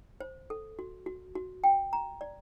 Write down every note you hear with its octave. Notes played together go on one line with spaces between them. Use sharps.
C5
A4
F#4
F#4
F#4
G5
A#5
D5